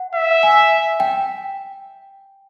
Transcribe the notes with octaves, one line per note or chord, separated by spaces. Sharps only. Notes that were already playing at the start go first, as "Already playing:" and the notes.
Already playing: F#5
E5
G#5
G5